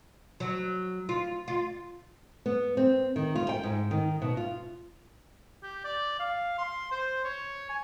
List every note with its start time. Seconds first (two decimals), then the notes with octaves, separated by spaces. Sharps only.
0.40 F#3
1.09 F4
1.48 F4
2.46 B3
2.77 C4
3.16 D#3
3.35 F4
3.49 G5
3.63 G#2
3.91 D#3
4.22 B2
4.37 F4
5.63 G4
5.84 D5
6.20 F5
6.58 C6
6.92 C5
7.24 C#5
7.70 G#5